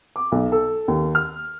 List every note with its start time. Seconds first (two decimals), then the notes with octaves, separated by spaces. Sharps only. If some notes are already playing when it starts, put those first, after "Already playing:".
0.16 D6
0.32 B1
0.52 A4
0.88 D#2
1.15 F6